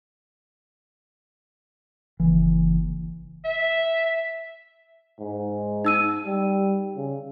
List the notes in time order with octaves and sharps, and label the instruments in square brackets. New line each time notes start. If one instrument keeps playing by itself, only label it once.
[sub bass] F#1 [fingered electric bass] E3
[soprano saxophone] E5
[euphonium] G#2
[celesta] D#4 E6 D#7
[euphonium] G3
C#3